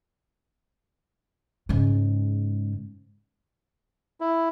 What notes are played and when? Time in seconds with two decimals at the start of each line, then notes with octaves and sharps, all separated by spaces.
1.69 G#2 C#3
4.21 E4